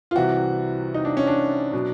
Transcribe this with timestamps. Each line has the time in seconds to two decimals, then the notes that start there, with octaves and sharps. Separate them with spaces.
0.11 F4
0.15 C2 C3 E3 F#4
0.94 D#4
1.05 D4
1.17 C#4
1.27 D4
1.73 B2 F#3